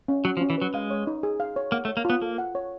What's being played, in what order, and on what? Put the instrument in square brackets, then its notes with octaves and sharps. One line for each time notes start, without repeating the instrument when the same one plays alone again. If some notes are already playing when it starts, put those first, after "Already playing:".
[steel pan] C#4
[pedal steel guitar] F#3 [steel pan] F#4
[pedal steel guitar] F3
[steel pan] C#4
[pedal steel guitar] E3
[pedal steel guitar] F#3 [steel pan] B4
[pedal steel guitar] G#3 [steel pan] F5
[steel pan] C#5
D#4
G#4
F5
C#5
[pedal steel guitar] A#3 [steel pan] F#5
[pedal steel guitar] A3
[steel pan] C#5
[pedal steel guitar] A#3
[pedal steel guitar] B3 [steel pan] F4
[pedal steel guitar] A#3 [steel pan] A4
[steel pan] F#5
C#5